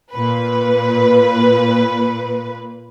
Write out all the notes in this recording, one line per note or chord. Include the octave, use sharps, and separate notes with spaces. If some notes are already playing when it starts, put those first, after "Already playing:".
A#2 B4